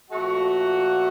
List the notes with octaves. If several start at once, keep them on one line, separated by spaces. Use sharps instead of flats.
A#2 F3 A3 F#4